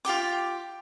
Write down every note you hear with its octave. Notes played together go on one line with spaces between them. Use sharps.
F4 G4 G5 D6